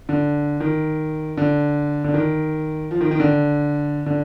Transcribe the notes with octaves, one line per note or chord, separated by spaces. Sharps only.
D3
D#3
D3
D3
D#3
F3
D#3
D#3
D3
D3